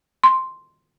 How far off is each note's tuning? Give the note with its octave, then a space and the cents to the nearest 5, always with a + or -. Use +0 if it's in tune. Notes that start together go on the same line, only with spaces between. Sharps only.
C6 +0